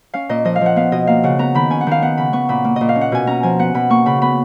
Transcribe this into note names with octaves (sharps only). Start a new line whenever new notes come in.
C#4 F5
A#2 D#5
F3 D#5
F5
F3 F#5
B3 F5
B2 D#5
A#3 F5
C#3 F#5
B3 A#5
D#3 B5
C#4 G#5
F#5
D#3 F5
B3 F#5
C#3 B5
B3 C#6
A#2 B5
A#3
A#2 D#5
F5
C#4
F#5
B2 G#5
C#4 A#5
F3 G#5
B3 F#5
B2 B5
A#3 C#6
C#3 B5
B3 B5